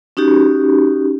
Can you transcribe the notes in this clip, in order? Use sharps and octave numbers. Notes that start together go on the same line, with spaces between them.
C#4 D#4 F#4 G4